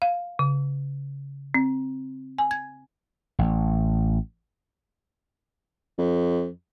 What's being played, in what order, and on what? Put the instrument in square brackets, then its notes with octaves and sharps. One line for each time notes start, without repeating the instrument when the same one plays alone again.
[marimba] F5
C#3
C4
G#5
G#6
[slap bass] A1
[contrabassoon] F2